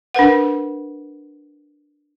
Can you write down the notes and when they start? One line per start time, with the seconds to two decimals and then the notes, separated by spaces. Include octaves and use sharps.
0.14 D4 A#4 B4 F#5